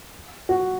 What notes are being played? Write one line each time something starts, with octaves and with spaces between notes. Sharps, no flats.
F#4